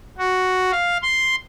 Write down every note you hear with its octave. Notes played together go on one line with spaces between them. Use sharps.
F#4
F5
C6